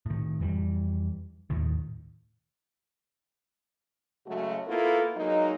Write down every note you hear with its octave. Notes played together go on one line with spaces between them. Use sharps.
A2 D#3
F2 E3 G3
D#2 A2 D#3
C#3 F#3 G#3 A3 F#4
A#3 B3 E4 F4 A4
F#3 G#3 A#3 D#4